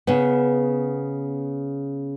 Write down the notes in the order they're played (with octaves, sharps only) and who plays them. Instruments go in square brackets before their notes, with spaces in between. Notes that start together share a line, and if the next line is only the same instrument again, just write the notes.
[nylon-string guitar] C#3 B3